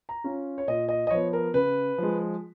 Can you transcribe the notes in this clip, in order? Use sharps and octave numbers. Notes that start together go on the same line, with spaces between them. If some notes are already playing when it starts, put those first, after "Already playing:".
A#5
C#4 F4
C#5
A#2 D#5
D#5
D#5
F3 B3 C#5
A#4
C#3 B4
F3 G#3